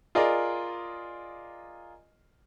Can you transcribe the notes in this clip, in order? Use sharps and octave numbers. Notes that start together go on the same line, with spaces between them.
F4 G#4 A#4 D5 D#5